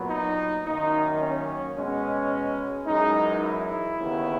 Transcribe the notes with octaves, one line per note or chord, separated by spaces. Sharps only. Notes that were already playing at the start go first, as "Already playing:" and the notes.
Already playing: A#2 F#3 B3
D#4
F#2 D#3 A#3 D#4
C#4
B2 G#3 B3 C#4
F#2 E3 G#3 D#4
E4
D#2 C#3 E3 B3